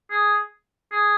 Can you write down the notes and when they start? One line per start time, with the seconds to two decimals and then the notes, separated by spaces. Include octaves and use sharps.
0.11 G#4
0.92 G#4